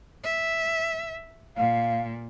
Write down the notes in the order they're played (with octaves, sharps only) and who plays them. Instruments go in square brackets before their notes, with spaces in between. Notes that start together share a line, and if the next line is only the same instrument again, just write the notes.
[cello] E5
[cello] A#2 [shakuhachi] F5